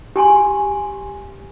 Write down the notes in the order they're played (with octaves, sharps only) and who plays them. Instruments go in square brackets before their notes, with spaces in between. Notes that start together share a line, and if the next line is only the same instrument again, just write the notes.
[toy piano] G4 G#5 C6